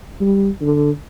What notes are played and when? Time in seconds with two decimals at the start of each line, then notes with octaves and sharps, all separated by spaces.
0.21 G3
0.62 D3